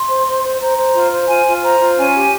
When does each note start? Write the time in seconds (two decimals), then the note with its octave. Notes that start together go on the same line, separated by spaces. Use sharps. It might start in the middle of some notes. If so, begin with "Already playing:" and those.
Already playing: C6
0.09 C5
0.26 C5
0.43 C5
0.60 C5 A#5
0.78 C5
0.95 F4
1.11 C5
1.29 F4 G#5
1.46 F4
1.63 C5 A#5
1.80 F4
1.97 C#4 G#5
2.15 G4